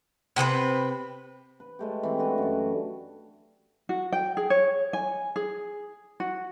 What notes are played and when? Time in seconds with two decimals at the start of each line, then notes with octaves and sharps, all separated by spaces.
0.36 C3 C4 G#4 B4
1.60 B4
1.79 G#3 A3 G4
2.03 E3 C4
2.18 A3 D4 F#4 B4
2.38 F#2 E3
3.89 F#4
4.12 G5
4.37 G#4
4.50 C#5
4.93 G#5
5.36 G#4
6.20 F#4